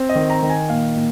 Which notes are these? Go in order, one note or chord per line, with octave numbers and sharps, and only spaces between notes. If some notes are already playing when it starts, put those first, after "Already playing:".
Already playing: C4
D#5
D#3
A#5
D#3
G#5
A#2 F5
A#2